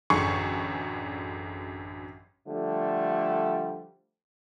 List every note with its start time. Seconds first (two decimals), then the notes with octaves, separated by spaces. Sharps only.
0.10 A1 F#2 D3 G#4 C#6 C#7
2.48 D3 F3 G3 A3